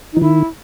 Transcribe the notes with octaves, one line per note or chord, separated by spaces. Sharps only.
D#4
E3
D#3 E4